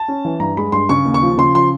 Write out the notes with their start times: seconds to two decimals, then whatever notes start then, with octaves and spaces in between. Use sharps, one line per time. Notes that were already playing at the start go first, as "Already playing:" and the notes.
Already playing: A5
0.08 C#4
0.25 E3
0.40 G2 A#5
0.57 G#3 B5
0.72 G2 C6
0.89 C#3 C#6
1.05 D#2
1.14 C#6
1.22 F3
1.38 C#3 C6
1.54 F3 C6